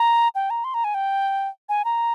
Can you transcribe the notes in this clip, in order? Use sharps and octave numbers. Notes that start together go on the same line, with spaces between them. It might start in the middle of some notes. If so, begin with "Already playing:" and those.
Already playing: A#5
G5
A#5
C6
A#5
G#5
G5
G#5
A#5